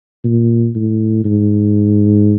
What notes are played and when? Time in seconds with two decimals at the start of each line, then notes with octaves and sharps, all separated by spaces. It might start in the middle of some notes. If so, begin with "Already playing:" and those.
0.24 A#2
0.75 A2
1.24 G#2